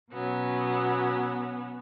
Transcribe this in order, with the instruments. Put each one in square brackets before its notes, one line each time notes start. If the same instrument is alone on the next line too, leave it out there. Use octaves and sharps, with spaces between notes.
[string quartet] B2 F#3 B3 C#4